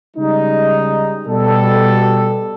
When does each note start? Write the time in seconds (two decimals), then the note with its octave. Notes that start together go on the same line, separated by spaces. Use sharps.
0.17 C#3 G3 G#3 D#4
1.26 B2 G3 A4